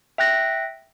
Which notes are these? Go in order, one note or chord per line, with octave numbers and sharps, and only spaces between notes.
E5 G5 F#6 A#6